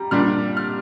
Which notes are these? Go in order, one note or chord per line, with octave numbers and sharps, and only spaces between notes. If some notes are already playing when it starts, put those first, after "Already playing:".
Already playing: G3 A#5
A#2 G3 D4 F6
F6